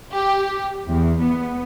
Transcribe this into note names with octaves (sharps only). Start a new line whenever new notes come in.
G4
E2
B3